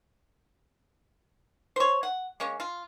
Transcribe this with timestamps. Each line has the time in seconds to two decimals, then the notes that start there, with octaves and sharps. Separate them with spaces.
1.76 C5 C#5
2.03 F#5
2.40 G#3 A#3 C#4
2.60 F4